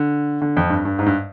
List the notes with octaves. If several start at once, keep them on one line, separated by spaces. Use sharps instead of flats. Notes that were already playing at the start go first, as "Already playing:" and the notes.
Already playing: D3
D3
F2
G2
G2
G#2
G2